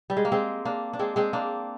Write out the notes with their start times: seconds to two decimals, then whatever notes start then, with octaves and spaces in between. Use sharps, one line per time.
0.10 G3
0.17 G#3
0.25 A#3
0.32 G#3 C4
0.65 A#3 D4
0.93 D4
0.99 G#3 C4
1.16 G#3 C4
1.33 A#3 D4